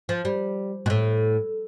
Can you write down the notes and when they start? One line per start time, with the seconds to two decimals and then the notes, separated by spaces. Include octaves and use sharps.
0.09 F3
0.25 G3
0.86 B2
0.90 A2